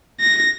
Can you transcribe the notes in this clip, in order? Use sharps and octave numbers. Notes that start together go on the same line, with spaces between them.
A#6